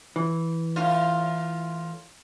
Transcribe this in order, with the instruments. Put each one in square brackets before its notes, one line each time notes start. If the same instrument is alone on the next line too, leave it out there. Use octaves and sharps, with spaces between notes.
[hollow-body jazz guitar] E3
[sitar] A2 F4